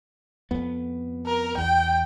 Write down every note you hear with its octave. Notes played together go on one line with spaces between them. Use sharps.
F2 B3
A#4
E2 G5